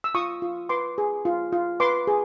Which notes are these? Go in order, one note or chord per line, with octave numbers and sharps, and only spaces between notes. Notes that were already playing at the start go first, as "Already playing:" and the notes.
E6
F4 C#6 D#6
F4
B4 C6 D6
G#4
F4
F4
B4 C6 D6
G#4